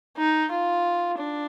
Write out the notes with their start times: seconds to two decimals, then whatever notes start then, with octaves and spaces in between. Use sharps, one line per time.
0.18 D#4
0.51 F4
1.18 D4